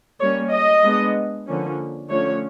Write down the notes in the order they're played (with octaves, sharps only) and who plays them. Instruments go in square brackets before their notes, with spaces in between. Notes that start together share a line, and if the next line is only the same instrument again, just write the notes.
[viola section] G3 A#3 C#4 C#5
D#5
G#3 B3 D4
D3 F3 A#3 C#4
D3 F3 A3 C#4 C#5